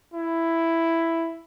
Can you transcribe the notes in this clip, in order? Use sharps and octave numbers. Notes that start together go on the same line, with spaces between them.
E4